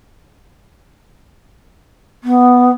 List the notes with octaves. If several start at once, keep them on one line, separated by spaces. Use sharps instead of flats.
B3